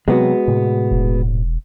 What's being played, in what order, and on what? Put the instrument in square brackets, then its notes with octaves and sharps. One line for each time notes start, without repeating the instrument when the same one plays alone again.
[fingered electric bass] C3 F#3 C4 [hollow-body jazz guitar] G#3 B3 F#4
[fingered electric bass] A2 C3
[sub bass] E1